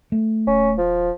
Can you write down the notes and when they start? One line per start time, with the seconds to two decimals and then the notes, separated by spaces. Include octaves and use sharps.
0.12 A3
0.47 D#1 C#4
0.78 F3